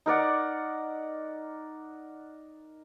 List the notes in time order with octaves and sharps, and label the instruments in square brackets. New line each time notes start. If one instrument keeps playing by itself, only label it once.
[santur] D#4 A#4 D5 F#5